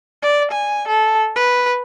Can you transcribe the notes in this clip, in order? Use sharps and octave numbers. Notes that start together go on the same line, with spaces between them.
D5
G#5
A4
B4